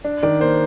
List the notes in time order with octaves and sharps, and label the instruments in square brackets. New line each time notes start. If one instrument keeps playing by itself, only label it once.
[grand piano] D4
D#3 D5
A#3 C5